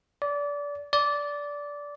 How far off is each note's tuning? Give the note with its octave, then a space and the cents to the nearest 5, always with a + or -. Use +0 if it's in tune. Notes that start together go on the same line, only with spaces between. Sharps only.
D5 -25
D5 -15